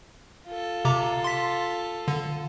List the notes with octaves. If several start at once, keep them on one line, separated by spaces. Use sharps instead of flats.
F4 A4
C3 A#5 D6
C6 B6
D3